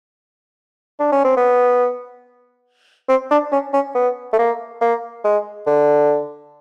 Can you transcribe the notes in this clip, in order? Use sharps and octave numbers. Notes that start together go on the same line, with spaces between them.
D4
C#4
C4
B3
C4
D4
C#4
C#4
B3
A3
A#3
A#3
G#3
D3